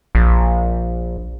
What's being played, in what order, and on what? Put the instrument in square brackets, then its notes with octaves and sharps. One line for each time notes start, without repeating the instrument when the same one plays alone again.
[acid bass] A#1